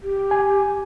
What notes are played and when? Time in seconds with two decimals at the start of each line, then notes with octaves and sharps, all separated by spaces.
0.03 G4
0.31 G#5